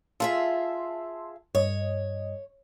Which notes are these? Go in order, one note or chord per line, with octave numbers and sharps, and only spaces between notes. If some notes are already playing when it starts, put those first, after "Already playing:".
F4 G#4 E5 A5 C6 E6
G2 C#5 D#5